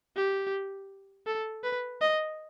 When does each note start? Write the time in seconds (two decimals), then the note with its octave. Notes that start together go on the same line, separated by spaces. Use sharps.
0.17 G4
1.27 A4
1.64 B4
2.01 D#5